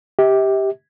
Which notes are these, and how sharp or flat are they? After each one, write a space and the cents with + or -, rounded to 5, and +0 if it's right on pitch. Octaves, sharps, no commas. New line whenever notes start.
G4 +0 E5 -40